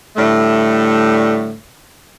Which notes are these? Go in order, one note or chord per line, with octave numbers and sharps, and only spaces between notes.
A2 D3 G3 A3